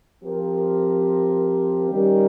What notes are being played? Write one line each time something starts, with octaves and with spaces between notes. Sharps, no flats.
F3 C4 G4 A#4
D#3 G3 C#4 G4 A#4